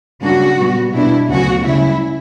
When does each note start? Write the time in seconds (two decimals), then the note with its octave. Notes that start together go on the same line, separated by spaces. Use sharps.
0.21 F#2 C#3 G3 A#3 D4 F#4
0.58 A#2 G3 B3
0.93 B2 G3 B3 D4 E4
1.29 D2 C#3 F#3 B3 F#4
1.65 F#2 C#3 G3 E4